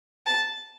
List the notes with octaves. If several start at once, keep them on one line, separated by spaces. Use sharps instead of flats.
A5